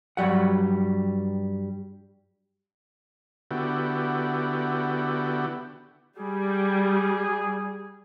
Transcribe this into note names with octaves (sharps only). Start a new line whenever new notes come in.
G2 F#3 G3 F#5
D3 B3 E4 F#4 G4
G3 G#4